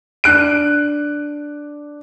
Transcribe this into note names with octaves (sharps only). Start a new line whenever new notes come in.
D4 F#6 D7